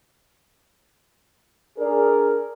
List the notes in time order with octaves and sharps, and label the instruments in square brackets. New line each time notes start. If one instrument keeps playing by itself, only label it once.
[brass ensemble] D4 G#4 A#4 D5